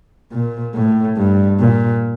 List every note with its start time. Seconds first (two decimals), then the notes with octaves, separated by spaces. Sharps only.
0.32 A#2
0.74 A2
1.17 G2
1.60 A#2